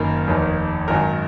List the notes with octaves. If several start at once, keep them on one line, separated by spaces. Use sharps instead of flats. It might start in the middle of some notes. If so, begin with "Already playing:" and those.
Already playing: F#1 F#2 D#3 A#3 A#4
F1 D#2 D#3
G#1 F#2 D#3 F#3 A#4